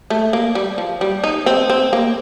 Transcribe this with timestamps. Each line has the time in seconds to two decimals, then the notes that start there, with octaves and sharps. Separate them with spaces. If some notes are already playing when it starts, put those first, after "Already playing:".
0.10 A3
0.33 A#3
0.55 G3
0.78 F3
1.01 G3
1.24 D#4
1.46 C4
1.70 C4
1.93 A#3